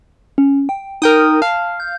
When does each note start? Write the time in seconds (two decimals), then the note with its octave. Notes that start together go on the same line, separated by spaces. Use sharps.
0.38 C#4
0.69 G5
1.02 D#4 A#4 G5 D#6
1.42 F5 A5
1.80 G6